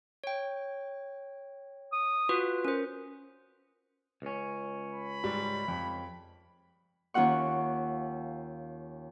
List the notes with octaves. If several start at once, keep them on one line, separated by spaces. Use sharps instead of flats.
C#5 G5
D#6
F4 F#4 B4
C#4 A#4 C5
C#2 C#4
B5
G#2 G3
F2
D#2 C#4 F4 F#5 C#6